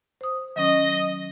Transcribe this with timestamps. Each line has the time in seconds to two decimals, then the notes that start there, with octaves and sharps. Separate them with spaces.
0.21 C5 D#6
0.56 D#3 F#3 C#4 D#5